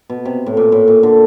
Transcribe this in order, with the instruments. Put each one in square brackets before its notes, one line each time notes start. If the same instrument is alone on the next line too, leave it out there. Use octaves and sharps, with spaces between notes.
[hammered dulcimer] B2
C3
A2
A#2
A2
A#2
D3